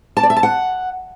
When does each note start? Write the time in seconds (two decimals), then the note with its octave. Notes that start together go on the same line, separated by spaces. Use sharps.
0.17 A5
0.23 D5
0.30 E5
0.36 A5
0.43 F#5